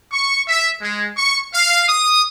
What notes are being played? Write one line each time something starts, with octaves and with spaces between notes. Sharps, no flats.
C#6
E5
G#3
C#6
F5
D#6